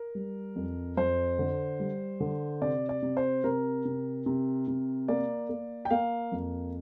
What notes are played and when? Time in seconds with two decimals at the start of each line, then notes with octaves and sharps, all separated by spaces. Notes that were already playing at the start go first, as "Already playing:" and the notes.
Already playing: A#4
0.15 G3
0.56 F2
0.97 F2 C5
1.39 D3
1.80 G3
2.20 D3
2.62 C3 D5
2.89 D5
3.02 C3
3.17 C5
3.44 C3 A#4
3.85 C3
4.26 C3
4.68 C3
5.08 A#3 D5
5.49 A#3
5.85 G5
5.90 A#3 F5
6.32 F2